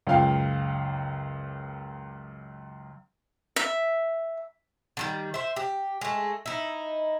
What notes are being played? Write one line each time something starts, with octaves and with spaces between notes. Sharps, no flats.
C#2 F#2 F5 G5
E5
D3 D#3 G3
C5 E5
G4
G#3 A3
D#4 E4